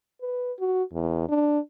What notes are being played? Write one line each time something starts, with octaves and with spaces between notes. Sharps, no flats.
B4
F#4
E2
D4